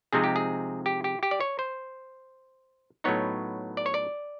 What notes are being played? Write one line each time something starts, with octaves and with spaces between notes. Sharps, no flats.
C3 F3 G#3 C4 D#4 G#4
G4
G#4
G4
G4
G4
D5
C#5
C5
A2 F#3 B3 D#4 C#5
D5
C#5
D5